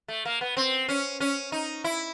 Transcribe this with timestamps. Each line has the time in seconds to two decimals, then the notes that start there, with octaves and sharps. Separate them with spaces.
0.08 A3
0.25 A#3
0.41 B3
0.57 C4
0.89 C#4
1.20 C#4
1.52 D#4
1.84 E4